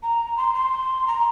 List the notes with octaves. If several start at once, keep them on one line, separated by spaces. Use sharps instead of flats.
A#5
C6
C6
A#5